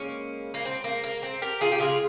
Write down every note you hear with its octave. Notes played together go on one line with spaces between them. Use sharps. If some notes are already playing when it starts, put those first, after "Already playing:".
Already playing: C#3 G#3 A#3 C#4
A#3
C4
A#3
A#3
C4
G4 A#4
F4 G#4
G4
C#3 F3 G#3 F4 G#4